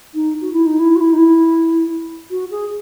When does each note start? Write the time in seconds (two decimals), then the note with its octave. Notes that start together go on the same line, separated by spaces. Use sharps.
0.14 D#4
0.41 F#4
0.53 E4
0.66 D#4
0.79 E4
0.96 F#4
1.01 E4
1.13 D#4
1.18 E4
2.31 F#4
2.51 G#4